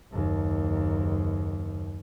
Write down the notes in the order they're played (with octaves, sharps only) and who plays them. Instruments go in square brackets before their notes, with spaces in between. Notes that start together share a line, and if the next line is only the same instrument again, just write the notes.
[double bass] F#1 D#2